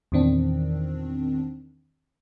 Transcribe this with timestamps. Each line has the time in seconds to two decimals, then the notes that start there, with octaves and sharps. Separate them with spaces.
0.12 E2 A#2 D#3 C4 D4